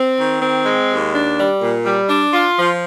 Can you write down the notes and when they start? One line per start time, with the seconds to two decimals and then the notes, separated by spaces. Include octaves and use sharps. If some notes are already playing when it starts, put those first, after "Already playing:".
Already playing: C4
0.18 D#3
0.42 C4
0.66 G#3
0.89 D#2
1.14 D4
1.37 G3
1.61 A#2
1.85 G3
2.09 D4
2.33 F4
2.57 F3